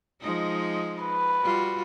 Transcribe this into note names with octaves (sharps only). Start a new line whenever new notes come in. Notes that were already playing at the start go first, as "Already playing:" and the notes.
F3 G#3 D#4
B4
G3 F4 F#4